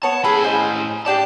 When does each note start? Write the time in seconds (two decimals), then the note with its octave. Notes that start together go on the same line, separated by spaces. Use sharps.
0.03 B3 C#5 A5
0.24 A2 G#4 A4 G#5 B5
0.44 C5 D#5
1.06 D4 G4 D5 A5